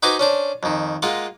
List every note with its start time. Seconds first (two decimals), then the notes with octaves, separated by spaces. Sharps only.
0.03 D#4 F#4 B4 C5 G#5 D6
0.19 C#4 D4 C5
0.63 F2 D#3
1.02 G#3 A#3 F4 F#5